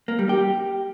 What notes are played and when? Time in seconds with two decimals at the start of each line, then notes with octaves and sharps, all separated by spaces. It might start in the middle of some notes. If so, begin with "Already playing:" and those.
0.08 A#3
0.19 G3
0.29 G4